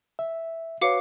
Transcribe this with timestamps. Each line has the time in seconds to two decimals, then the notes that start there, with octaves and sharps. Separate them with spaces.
0.19 E5
0.82 F#4 B4 C#5 F5 D6 C#7